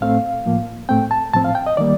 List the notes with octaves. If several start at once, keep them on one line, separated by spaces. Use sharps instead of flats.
A2 A3 C4 F5
A2 F3 A#3
A2 A3 C4 G5
A5
A2 F3 C4 A5
F5
G5
D#5
D#3 G3 A#3 D5